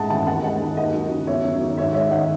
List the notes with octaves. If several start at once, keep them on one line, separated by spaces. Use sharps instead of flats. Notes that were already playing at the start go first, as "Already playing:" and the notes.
Already playing: A2 G#3 F#5 A5
E3 F#5 A5
D#2 F#5 A5
G#3 D#5 F#5
D#3
D#2 D#5 F#5
F#3
C#3
E2 C#5 E5
F#3
D#3
G#2 C#5 E5
G#3 C#5 E5
D#3 D#5 F#5